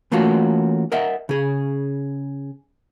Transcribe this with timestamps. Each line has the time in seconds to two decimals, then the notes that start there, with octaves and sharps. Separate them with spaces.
0.12 E3 A3 A#3 C#4 F4 F#4
0.92 A#4 D#5 E5 F#5
1.29 C#3 G#4